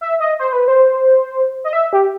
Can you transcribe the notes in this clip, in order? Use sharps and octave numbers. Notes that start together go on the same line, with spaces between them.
E5
D#5
C5
B4
C5
D#5
E5
G4